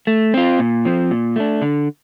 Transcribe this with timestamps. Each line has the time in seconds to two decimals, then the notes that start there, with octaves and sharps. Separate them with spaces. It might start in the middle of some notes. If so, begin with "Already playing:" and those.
0.07 A3
0.34 C4 F4
0.59 A#2
0.85 F3 C4
1.11 A#2
1.36 A3 D4
1.62 D3